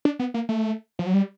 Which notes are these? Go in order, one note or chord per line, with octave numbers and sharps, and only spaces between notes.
D4
B3
A#3
A3
F3
F#3
G3